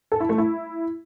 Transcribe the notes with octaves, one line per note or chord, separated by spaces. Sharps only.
A4
E4
A3
E4